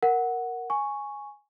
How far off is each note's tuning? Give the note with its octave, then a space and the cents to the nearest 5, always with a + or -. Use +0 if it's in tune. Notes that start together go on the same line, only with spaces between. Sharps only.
A#4 +0 F#5 +0
G#5 +0 C#6 +0